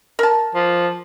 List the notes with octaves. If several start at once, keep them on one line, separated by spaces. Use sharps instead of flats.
A#4 A5
F3